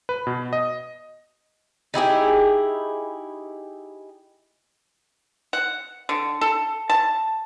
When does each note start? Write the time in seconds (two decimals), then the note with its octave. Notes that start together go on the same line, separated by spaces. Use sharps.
0.09 B4
0.27 B2
0.53 D#5
1.94 D#4 E4 G4 G#4
5.53 F#5
6.09 D3
6.41 A4
6.90 A5